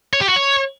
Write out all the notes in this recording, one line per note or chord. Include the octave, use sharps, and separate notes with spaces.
C#5
G4
F#4
C#5